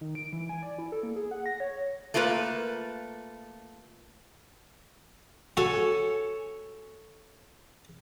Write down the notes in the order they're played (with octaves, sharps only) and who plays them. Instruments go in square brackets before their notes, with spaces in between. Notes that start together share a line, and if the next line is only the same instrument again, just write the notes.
[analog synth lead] D#3
D7
E3
G#5
D5
E4
A4
A#3
G#4
F#5
A#6
C#5
[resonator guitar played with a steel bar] A3 A#3 F4 A#4 B4
[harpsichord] F#4 [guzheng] A4 C#5 G#5